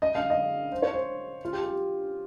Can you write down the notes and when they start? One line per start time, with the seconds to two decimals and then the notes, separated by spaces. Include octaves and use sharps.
0.02 D#5
0.15 F5
0.30 D#5
0.72 C5
0.82 C#5
0.93 C5
1.45 F4
1.53 G4
1.64 G4